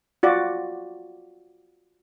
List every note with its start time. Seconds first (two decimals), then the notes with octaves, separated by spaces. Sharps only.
0.23 F4 F#4 D5